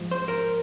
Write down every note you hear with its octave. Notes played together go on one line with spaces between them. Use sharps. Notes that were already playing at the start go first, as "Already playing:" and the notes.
Already playing: G#2 F3
C5
A#4